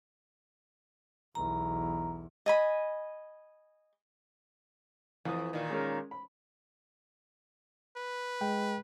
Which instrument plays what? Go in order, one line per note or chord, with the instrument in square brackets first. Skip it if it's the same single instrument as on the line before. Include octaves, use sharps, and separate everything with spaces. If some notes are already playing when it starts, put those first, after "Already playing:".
[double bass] B1 E2 [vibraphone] A#5
[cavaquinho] D#5 G#5 B5
[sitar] F2 [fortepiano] E3 D#6
[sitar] A#2 D#3
[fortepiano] G#3 C#4 A#4
B5
[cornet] B4
[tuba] G#3 [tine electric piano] G5